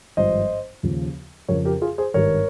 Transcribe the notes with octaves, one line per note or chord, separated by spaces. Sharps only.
G#1 G2 F3 C5 D#5
D#2 C#3 F3
F2 C#3 F3 A#4 C#5
G4 A#4
F4 G#4
G#4 C5
G#1 G2 D#3 G3 A#4 C#5